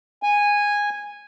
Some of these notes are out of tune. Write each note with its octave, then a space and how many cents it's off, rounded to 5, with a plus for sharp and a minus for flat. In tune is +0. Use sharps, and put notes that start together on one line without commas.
G#5 -10